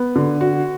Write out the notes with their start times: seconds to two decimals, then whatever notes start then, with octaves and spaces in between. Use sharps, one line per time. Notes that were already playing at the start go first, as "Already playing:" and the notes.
Already playing: B3
0.16 D3
0.41 F#4